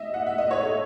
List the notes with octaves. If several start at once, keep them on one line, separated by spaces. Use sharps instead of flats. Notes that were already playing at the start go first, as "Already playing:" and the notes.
Already playing: D#5 E5
F#5
E5
D#5
C#5
A4